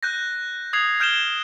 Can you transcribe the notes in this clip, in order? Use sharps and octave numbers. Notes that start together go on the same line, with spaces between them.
F#6 G6 A#6
D#6 G#6 C7 F7
F6 G6 D7 E7 G7